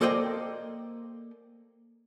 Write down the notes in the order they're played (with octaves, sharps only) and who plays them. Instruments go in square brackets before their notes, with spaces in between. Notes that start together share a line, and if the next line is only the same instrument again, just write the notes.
[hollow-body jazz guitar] A#3 A4 C5 D5 D#5 G5